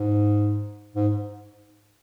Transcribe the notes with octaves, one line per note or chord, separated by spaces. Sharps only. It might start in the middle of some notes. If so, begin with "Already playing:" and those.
Already playing: G#2
G#2